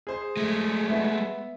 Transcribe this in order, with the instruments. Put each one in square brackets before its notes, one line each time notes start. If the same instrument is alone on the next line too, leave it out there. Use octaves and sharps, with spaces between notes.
[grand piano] G#4 C5
[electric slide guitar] G#3 A3
[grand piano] B3 E5